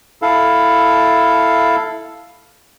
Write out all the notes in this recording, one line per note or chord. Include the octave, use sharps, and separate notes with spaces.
E4 A4 F5